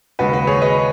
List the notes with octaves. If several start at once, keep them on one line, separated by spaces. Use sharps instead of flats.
D#2 C#3 G#3 C#4 F#4 B4
F#4 B4
G#4 C#5
B4 D#5